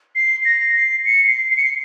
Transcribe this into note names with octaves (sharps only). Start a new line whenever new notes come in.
C7
A#6
C7
C#7
C7
C7
C#7
C7